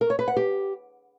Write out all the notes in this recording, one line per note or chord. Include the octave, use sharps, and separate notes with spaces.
A#4
C#5
B4
F#5
G4